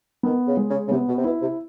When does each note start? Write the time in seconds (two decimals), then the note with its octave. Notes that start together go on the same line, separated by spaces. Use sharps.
0.23 D#3 B3
0.46 C#3
0.57 G#3
0.69 C#3
0.87 C#3
0.91 C3 B3
1.08 B2
1.16 C3
1.24 B2 E4
1.41 C3